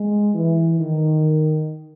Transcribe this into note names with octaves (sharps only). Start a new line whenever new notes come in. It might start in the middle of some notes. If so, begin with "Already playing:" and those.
Already playing: G#3
E3
D#3